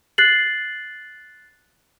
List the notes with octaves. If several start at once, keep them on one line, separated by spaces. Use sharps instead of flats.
F#6 A6 C7 F#7